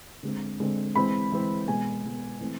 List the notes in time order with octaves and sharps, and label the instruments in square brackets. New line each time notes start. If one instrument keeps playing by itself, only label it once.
[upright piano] D3 G#3 C4
D3 G#3 C4
E3 G#3 C4 B5
E3 G#3 C4
B2 G#3 B3 G#5
B2 G#3 B3
E3 A3 C4